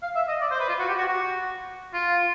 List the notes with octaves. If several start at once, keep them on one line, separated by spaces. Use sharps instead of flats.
F5
E5
D#5
D5
C5
B4
F4
F#4
G4
F#4
F#4
F4